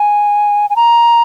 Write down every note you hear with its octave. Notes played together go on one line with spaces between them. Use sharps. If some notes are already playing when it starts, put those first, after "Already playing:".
Already playing: G#5
G#5
A#5